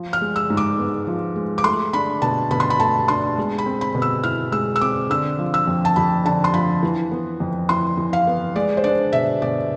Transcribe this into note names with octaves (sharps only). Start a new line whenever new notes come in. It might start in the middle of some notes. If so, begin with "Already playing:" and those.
Already playing: F3
F6
G#3
E6
G#2
D6
B3
F3
G#3
D6
A3 C6
D4 B5
B2 A5
B2 B5
C6
B5
A3 A5
D4 C6
G#3
B5
C4
B5
B2
E6
E4 F6
G#3 E6
E6
C4 D6
D3 E6
F3
E6
F2
A5
F2 B5
D3 A5
C6
F3 B5
E3
B3
F2
E4 C6
E3
F5
B3
G#3 D5
C5
D4 D5
B2 E5
B2 D5